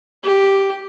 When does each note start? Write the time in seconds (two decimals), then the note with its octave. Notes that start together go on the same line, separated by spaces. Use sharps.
0.23 G4